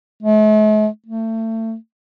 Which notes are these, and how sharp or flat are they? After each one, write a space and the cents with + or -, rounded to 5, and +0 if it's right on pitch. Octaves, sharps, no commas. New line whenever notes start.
A3 -45
A3 +30